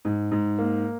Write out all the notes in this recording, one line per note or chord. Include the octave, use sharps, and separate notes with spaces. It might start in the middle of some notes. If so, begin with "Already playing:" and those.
G#2
G#2
A#3